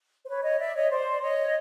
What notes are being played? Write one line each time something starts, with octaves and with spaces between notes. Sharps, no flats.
C5
B4 C#5
C#5 D#5
D5 E5
C#5 D#5
C5 D5
D5
C#5 D#5